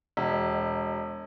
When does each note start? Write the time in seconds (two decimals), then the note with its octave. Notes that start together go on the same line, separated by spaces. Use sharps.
0.17 E1